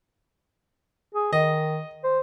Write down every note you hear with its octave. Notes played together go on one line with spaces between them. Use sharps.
G#4
D#3 D#5
C5